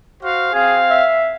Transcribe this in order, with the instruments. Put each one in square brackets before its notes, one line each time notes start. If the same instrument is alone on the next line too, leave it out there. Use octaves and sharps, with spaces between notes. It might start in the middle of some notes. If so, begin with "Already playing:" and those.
[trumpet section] F#4 C5 F5
[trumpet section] C4 F5 [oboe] G#4
[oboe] E5